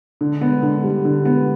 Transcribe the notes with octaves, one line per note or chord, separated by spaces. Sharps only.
D3
B3
D3
G3
D3
B3